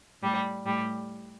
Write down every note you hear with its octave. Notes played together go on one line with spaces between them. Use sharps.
A2 G3
A2 G3